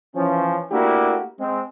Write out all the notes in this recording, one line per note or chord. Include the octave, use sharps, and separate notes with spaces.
E3 F3 C#4
A3 A#3 D4 E4 F#4 G4
G#3 C4